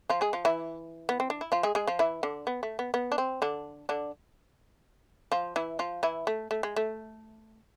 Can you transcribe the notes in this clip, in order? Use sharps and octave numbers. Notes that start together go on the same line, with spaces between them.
F3 F4
G#3 G#4
F3 F4
E3 E4
B3
C4
D4
E4
F3 F4
G#3 G#4
G#3 G#4
F3 F4
E3 E4
D3 D4
B3
A3
B3
B3
D4
C4
D3 D4
D3 D4
F3 F4
E3 E4
F3 F4
E3 E4
A3
A3
G#3
A3